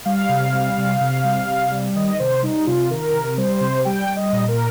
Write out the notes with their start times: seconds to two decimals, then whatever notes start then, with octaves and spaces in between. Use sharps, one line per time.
0.05 G3 F5
0.29 C3
0.53 G3
0.77 C3
1.01 C3
1.24 G3
1.48 C3
1.71 G3
1.96 D#3 D#5
2.19 C3 C5
2.42 G3 D#4
2.67 C3 F4
2.90 D#3 A#4
3.14 C3
3.37 G3 C5
3.61 C3
3.85 G3 G5
4.09 G3
4.16 D#5
4.33 A#2
4.48 A#4